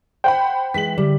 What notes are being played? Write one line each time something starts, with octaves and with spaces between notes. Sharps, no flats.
C5 F#5 G5 B5
E3 G#3 B6 F#7
D3 G3